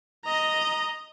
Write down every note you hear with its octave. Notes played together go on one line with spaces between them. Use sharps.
D#5 A#5